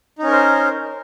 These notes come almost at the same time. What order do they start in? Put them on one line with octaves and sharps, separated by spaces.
D#4 C#4 A#4 C5